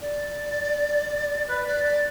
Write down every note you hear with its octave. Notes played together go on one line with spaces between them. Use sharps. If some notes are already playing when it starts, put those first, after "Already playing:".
D5
B4
D5
D5